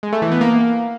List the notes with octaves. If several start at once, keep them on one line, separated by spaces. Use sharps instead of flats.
G#3
A3
E3
B3
A#3